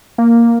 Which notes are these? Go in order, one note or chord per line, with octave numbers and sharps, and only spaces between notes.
A#3